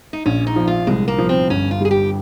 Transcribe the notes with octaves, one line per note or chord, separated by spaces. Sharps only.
D#4
A#1 C#4
D#4
F3
F4
C2 G#3
A#3
F3
C4
G1 C#4
F4
G3 G#4
G4